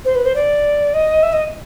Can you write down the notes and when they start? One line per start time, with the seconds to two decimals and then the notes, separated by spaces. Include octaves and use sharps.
0.05 C5
0.15 B4
0.25 C5
0.35 D5
0.93 D#5
1.22 E5
1.32 D#5